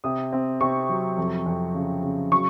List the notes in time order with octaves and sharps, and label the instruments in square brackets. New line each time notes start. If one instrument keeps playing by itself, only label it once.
[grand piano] C3 [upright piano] D#6
[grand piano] C4
[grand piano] C3 [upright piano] C#6
[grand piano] F#3
F2
F2
C#3
C#3
[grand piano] F#3 [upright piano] C#6